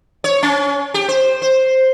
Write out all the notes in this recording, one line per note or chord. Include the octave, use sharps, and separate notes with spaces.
C#5
C#4
G4
C5
C5